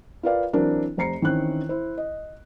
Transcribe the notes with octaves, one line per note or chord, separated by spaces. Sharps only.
F4 A#4 B4 D5 F5
E3 F#3 C4 D4 A#4
F1 C5 A#5 C7 C#7
D#3 E3 C4 C#4 F#6
E4 C5
D#5